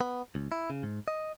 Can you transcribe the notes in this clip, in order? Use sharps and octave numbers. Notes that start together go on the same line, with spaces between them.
B3
C#2
E4
C#3
G#2
D#5